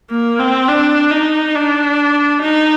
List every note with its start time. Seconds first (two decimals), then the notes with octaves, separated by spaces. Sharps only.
0.11 A#3
0.39 C4
0.68 D4
1.11 D#4
1.55 D4
2.42 D#4